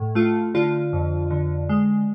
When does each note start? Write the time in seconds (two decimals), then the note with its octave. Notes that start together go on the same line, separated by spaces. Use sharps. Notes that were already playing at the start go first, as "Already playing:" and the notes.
Already playing: A2
0.15 A3 F4
0.54 D3 F4
0.93 F2
1.31 D3
1.69 G#3